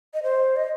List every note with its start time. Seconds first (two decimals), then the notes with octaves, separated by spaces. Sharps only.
0.14 D#5
0.23 C5
0.56 D#5